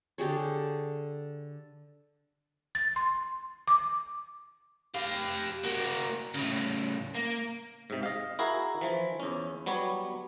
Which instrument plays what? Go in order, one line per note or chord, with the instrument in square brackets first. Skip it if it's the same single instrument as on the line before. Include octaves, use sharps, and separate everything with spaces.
[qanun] D3 G4 G#4 C#5
[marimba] A6
C6
D6
[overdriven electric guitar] G4 F5
A#3 F#4
A2 C#3
A#3
[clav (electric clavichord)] G#2 C3
D#5 F5
E4 F#4 G#4 A#4 F5
E3 F3
E2 C#4
F#3 G3 B3 C#5